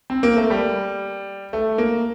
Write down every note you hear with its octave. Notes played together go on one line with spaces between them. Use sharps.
C4
A#3
A3
G3
A3
A#3